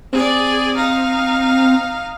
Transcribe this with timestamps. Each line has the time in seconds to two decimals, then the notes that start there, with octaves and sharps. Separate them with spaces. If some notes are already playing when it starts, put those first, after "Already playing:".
0.13 C4 G#4 D5
0.76 D#4 F5